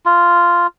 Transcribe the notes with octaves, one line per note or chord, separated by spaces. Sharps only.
F4